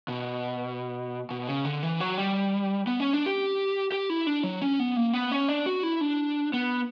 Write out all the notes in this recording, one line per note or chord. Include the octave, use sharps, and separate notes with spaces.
B2
B2
C#3
D3
E3
F#3
G3
B3
C#4
D4
G4
G4
E4
D4
F#3
C#4
B3
A#3
B3
C#4
D4
F#4
E4
D4
B3